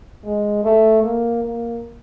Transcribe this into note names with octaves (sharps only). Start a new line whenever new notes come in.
G#3
A3
A#3
A#3